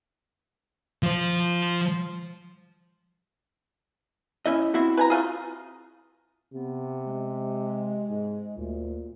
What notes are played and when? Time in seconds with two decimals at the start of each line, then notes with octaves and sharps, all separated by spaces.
1.03 F3 C5
4.46 C#4 E4 D#5
4.74 C4 E4 F#4
4.97 B4 G#5 A#5
5.10 A3 F4 G#4
6.54 C3 B3
7.06 G#3
8.10 G#2
8.57 D2 A#2